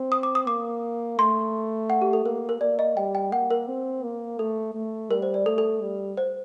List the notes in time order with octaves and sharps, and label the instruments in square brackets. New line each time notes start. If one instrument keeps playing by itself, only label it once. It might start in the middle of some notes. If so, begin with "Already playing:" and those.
Already playing: [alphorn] C4
[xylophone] D#6
D6
D#6
[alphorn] A#3 [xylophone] D6
[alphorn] A3 [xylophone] C6
[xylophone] F#5
G4
A4
[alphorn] A#3 [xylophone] A#4
[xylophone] A#4
[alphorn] A#3 [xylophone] D5
[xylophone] D#5
[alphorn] G3 [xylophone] G5
[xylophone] G5
[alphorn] A#3 [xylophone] F#5
[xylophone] A#4
[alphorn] C4
A#3
[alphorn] A3 [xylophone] A4
[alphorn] A3
[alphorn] G3 [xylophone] A#4
[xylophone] C5
D5
[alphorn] A3 [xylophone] A4
[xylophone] A4
[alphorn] G3
[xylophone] C5